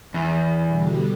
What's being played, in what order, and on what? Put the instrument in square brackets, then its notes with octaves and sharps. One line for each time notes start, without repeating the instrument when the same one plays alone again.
[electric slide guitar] E2
[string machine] B2 D3 G3